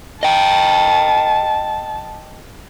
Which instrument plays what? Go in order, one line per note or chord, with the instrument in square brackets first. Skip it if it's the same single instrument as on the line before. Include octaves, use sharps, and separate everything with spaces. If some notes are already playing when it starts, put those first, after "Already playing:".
[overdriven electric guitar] D#5 G5 [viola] A5